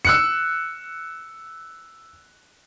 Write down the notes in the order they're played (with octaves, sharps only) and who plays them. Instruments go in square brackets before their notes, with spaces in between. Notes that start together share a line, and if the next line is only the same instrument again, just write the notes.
[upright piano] E6 F#6 C#7